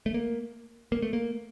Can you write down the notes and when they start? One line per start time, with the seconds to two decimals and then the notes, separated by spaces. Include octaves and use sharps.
0.06 A3
0.14 A#3
0.92 A#3
1.02 A3
1.13 A#3